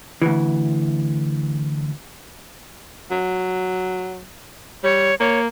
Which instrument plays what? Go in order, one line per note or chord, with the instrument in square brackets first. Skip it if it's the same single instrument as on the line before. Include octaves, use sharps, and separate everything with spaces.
[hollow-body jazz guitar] D2 E3
[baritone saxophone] F#3
[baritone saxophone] G3 [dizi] C#5
[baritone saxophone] A#3 [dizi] C#5